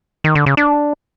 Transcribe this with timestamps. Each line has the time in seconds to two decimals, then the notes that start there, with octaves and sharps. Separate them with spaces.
0.24 D#3
0.35 D3
0.46 C#3
0.57 D4